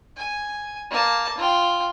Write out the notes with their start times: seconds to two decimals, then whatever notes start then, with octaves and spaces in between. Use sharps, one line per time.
0.16 G#5
0.90 A#3 A5
1.37 F4 G5